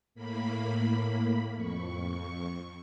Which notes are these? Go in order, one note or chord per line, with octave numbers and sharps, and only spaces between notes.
A2 A#3 B5
F2 C#6